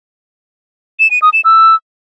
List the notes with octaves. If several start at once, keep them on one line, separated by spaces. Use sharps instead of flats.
E7
D#7
D#6
E7
E6